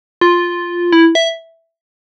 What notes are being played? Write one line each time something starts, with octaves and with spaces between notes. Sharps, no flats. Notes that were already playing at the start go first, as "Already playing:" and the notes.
F4
E4
E5